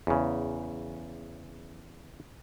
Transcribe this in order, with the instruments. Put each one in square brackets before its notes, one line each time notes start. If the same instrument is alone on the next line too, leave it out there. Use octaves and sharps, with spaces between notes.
[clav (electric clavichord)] E2 C#3